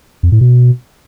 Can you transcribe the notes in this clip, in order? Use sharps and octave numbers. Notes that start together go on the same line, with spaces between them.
F2
A2
B2